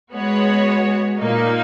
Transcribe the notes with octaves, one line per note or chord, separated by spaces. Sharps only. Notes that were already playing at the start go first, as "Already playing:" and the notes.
G#3 B3 F#4 C#5
A#2 A#3 D#4